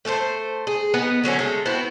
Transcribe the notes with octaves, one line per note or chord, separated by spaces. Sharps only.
A3 A4 A#4 C5
G#4
B3 D#4 B4
D3 F#3 C4 C#4
F#3 G#3 A3
B3 C4 E4 F#4